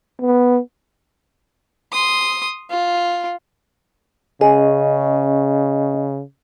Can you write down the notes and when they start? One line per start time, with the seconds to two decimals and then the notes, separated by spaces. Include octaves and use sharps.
0.22 B3
1.92 C6 D#6
2.70 F4
4.41 C#3 C#4 G#4 D#5